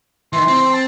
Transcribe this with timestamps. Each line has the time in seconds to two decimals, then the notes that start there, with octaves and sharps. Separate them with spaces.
0.33 D#3 E3 C6
0.48 C4
0.73 A5